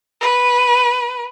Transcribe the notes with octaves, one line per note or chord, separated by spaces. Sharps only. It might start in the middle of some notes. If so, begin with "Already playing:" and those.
B4